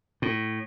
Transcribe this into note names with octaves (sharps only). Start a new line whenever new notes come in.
A2